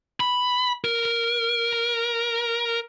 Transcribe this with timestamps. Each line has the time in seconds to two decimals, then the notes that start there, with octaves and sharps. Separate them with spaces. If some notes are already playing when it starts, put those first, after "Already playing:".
0.20 B5
0.85 A#4